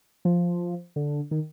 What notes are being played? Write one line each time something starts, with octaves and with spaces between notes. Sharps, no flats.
F3
D3
D#3